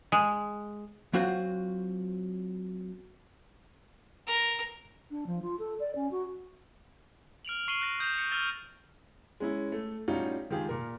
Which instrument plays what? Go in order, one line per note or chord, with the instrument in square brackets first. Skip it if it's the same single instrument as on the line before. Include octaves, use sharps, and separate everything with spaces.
[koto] G#3
[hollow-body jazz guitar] F#3 C4 F4 F#4 F5
[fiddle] A#4
[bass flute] D4
F3
F4
A4
D5
C#4
F#4
[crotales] F6 D7 F7 F#7
C#6 C7 D7 D#7 F#7 G7
F#6 A#6 C7
D#6 G6 A#6 E7 F7
C#7
E6 F6 A6 C#7 D#7 F7
[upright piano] G#3 C#4 E4
A3
A2 G3 C#4 D#4 F4 F#4
D#3 G#3 F4 G4 G#4
A#2 A#4